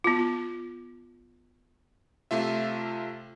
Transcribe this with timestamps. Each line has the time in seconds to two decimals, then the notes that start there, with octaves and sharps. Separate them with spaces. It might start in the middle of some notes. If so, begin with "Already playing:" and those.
0.04 B3 F4
2.31 C3 A3 F4 E5